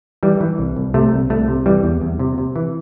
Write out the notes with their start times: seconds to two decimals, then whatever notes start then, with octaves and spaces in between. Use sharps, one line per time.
0.23 E3 G3
0.41 E3
0.59 C2
0.76 C2
0.94 C3 A3
1.13 C2
1.30 C2 A3
1.48 C3
1.66 E3 G3
1.84 E2
2.01 E2
2.19 C3
2.38 C3
2.56 E3